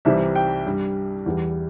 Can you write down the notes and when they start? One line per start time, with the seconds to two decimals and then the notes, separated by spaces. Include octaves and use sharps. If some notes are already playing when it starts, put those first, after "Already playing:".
0.05 C2 C3 E3 G3 E5
0.35 G5
0.66 G2 G3
1.26 E2 E3 G3